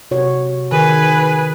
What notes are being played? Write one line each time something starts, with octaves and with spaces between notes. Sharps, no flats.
C3 F#4 C#5
D#3 G#4 B4 G#5